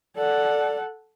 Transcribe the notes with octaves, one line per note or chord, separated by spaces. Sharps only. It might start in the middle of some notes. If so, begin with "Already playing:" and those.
A4 D5 F#5